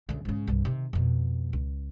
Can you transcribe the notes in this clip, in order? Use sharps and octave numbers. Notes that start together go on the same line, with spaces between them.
D2 C#3
G#2 C#3
C2 G2
C3 D#3
F2 B2
C#2